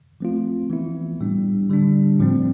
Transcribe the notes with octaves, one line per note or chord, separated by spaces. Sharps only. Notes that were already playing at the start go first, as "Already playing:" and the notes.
F3 A3 C4 F4
E3 B3 E4
A2 G3 D4
D3 G3 D4
A2 F3 C4